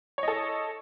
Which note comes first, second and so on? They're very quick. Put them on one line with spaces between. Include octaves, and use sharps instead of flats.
C#5 D#5 A4